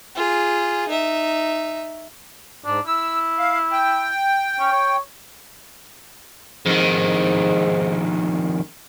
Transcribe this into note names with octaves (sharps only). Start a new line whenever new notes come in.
F4 G#4
D#4 E5
G#2 D4
E4 E6
F5
G5
C#4
C#5
F2 G#2 D#3